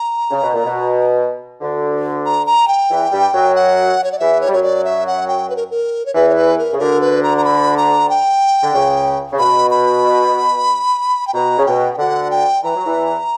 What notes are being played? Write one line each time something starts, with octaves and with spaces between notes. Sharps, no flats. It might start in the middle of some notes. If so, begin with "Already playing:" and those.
Already playing: A#5
C#3
B2
A#2
B2
D2 D3
A#5
A#5
G5
E2 E3
G2 G3
F#2 F#3
F#5
C#5
D5
E2 E3 E5
C#5
G3
F#2 F#3 C#5
D5
E5
F#5
G5
B4
A#4
A#4
C#5
E2 E3 B4
C#5
B4
A#4
C#3
D2 D3 A#4
B4
A#5
A#5
B5
A#5
G5
D3
C#2 C#3
C#3
B2 B5
B5
G5
B2 A#5
C#3
B2 G5
G5
D2 D3 F#5
G5
E3 A#5
F#3
E2 E3